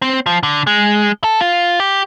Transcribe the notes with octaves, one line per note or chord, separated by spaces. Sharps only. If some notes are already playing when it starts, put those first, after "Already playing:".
C4
F3
D3
G#3
A4
F4
G4